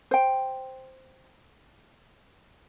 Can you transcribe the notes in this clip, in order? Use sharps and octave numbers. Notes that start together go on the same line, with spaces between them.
C5 G5